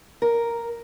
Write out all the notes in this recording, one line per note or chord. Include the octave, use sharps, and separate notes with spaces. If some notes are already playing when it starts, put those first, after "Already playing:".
A#4